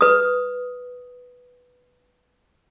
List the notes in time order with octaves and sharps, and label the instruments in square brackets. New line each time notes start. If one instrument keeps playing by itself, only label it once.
[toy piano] B4 D#6